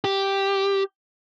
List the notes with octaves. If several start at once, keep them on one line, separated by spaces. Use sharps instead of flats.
G4